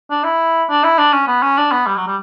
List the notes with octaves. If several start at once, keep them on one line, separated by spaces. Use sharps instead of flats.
D4
E4
D4
E4
D4
C#4
B3
C#4
D4
B3
G3
F#3
G3